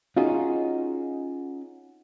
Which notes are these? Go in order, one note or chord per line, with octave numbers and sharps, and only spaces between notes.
C#4 D#4 F4 F#4 G#4